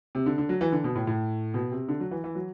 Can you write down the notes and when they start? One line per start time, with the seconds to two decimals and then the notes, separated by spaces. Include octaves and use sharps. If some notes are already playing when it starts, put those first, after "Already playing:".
0.15 C3
0.26 D3
0.38 D3
0.49 F#3
0.61 E3
0.72 D3
0.84 B2
0.96 A2
1.07 A2
1.54 B2
1.72 C3
1.89 D3
2.00 F#3
2.11 E3
2.24 E3
2.35 F#3